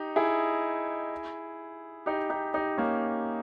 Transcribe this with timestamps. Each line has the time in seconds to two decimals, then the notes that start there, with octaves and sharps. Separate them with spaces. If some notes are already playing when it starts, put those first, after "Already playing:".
Already playing: D#4 G4
0.16 E4 G#4
2.06 D#4 G4
2.30 D#4 G4
2.54 D#4 G4
2.78 A#3 C#4